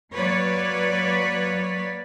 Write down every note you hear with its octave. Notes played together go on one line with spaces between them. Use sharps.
F#3 A#3 B4 C#5 D5